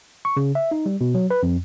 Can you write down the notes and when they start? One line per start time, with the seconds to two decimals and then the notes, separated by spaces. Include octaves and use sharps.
0.25 C#6
0.37 C#3
0.55 E5
0.71 D#4
0.86 G3
1.01 B2
1.15 F#3
1.30 B4
1.43 F2